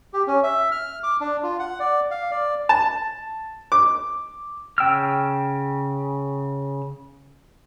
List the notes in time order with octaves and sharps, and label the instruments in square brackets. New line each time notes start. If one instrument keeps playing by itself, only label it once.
[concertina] G4
C#4
E5
F6
D6
D4
F4
F#5
D5
F5
D5
[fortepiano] A5
D6
[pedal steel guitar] C#3 G5 E6 F6